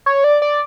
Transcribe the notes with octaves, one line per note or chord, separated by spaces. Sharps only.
C#5
D5
D5